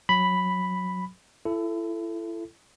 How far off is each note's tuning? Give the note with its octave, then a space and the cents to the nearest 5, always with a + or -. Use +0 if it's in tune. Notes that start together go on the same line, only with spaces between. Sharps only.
F#3 -15 B5 +0
E4 +30 A4 +0